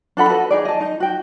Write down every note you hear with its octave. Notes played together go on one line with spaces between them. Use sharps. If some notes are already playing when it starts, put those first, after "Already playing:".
D4 A4 F#5 B5
F#4 A4 B4 D#5
D#4 G#4 D5
D#5 A5
D#4
F#4 G5